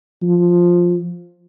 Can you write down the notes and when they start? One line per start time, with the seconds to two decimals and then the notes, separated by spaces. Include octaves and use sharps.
0.23 F3